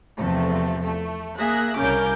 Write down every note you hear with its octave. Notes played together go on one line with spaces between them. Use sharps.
E2 C3 F3 A3
A3
A#3 G#4 E5 F#6 A#6
C2 C#3 C#4 A#4 D6 G6